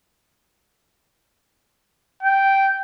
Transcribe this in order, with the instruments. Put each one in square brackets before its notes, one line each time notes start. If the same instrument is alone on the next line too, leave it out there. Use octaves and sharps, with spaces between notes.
[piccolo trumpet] G5